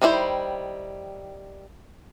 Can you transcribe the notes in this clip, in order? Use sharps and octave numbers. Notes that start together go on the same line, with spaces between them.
D#3 G3 D#4 E4 C5